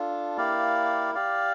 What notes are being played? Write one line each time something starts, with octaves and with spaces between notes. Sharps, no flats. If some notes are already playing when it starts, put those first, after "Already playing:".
Already playing: D4 F4 A4
A#3 E4 G4 D5 F5
G4 D5 F5